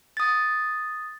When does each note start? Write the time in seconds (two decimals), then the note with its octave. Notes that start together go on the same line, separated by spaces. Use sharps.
0.17 D#6 A6